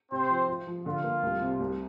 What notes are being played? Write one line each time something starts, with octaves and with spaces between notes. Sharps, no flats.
C3 C4 C5
F3
F4
F3
D3 F4
A#3
C2
C3
C2